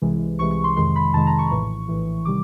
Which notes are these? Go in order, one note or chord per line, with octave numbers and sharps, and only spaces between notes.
C2 C3 E3 G#3
C2 C3 E3 G#3 C#6
C#6
C6
F2 C3 D#3 G#3 C6
B5
F2 C3 D#3 G#3 A5
A#5
C#6
A#1 A2 E3
A#1 A2 E3
C3 D#3 G3 D6